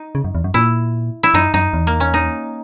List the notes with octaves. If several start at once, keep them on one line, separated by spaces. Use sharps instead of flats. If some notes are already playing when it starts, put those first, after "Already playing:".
Already playing: D#4
C#3
F#2
E2
F#2
A#2 E4
E4
F#2 D#4
F#2 D#4
E2
A#3
C#4
D#4